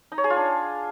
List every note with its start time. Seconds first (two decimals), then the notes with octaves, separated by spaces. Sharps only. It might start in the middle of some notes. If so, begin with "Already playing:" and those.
0.12 D#4
0.18 C#5
0.24 G#4
0.30 F4
0.36 D4